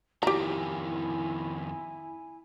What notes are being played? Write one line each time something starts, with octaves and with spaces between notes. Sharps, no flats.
F2 D#3 E4 G4 G#5 A#5